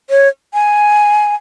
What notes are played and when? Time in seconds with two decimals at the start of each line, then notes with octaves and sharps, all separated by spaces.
0.10 C#5
0.54 G#5